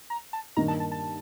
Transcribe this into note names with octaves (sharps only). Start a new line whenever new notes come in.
A#5
A5
G2 D#3 A#3 A#5
A5
A5
A5